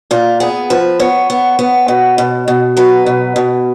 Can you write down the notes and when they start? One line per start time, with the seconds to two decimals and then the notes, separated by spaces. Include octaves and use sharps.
0.11 A#2 F4
0.40 B3 G#4
0.70 F3 B4
1.00 B3 C#5
1.30 B3
1.59 B3
1.88 B2
2.18 B2
2.48 B2
2.77 F#3 B4
3.06 B2
3.36 B2